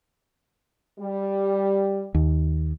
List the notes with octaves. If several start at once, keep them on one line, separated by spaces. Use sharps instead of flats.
G3
D#2